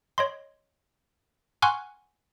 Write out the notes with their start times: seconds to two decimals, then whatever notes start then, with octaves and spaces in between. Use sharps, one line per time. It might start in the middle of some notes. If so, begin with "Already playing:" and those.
0.18 C#5 D#5 C6
1.62 F#5 G#5 C6 C#6 F6 F#6